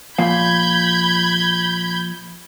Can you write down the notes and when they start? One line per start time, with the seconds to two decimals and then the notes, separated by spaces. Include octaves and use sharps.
0.19 A#2 F3 F5 B5 G6 G#6